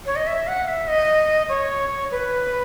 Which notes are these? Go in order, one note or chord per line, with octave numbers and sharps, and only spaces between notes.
C#5
D#5
E5
F#5
E5
D#5
C#5
B4